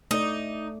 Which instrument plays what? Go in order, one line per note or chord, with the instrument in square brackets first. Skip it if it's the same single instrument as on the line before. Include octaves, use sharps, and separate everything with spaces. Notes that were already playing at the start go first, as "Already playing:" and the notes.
[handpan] A3 D5 [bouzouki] D#4